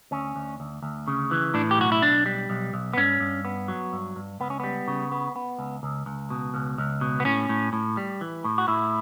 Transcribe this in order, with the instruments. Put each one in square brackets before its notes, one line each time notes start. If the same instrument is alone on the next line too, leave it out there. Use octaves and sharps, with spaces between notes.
[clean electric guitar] D2 C#4
D2
D2
D2
C#3
E3
A2 D4
G4
B1 F#4
E4
B1 D4
G3
B1
B1
B3
G2 C#4
G2
B3
F#3
G2
G2
C#2 B3
C#4
G3 B3
C#3
B3
B3
C#2
C#2
C#2
B2
C#2
C#2
B2
B3
A2 C#4
A2
A2
G3
E3
A2
F#4
A2 E4